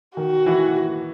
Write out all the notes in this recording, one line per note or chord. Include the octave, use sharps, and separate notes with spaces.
D#3 F#4
E3